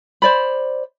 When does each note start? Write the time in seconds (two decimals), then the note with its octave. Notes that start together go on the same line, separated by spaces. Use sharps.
0.22 C5 D5 B5